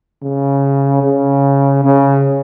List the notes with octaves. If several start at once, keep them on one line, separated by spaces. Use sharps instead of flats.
C#3
C#3
C#3